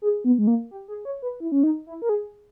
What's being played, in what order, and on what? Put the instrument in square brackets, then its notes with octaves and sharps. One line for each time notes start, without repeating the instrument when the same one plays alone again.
[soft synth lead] G#4
B3
G#3
A#3
G4
G#4
C#5
B4
E4
C#4
D#4
E4
A#4
G#4